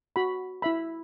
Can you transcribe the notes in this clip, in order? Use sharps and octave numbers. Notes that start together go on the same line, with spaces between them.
F#4 B5
E4 E5 B5